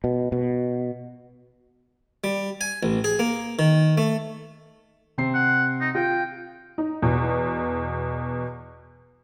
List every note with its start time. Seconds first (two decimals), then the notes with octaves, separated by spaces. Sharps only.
0.04 B2
0.32 B2
2.24 G3
2.61 G#5
2.83 A1
3.04 G#4
3.19 A#3
3.59 D#3
3.98 A3
5.18 C3 C4 C7
5.34 F#5
5.81 D#4
5.95 F4 G5
6.78 D#4
7.02 E2 B2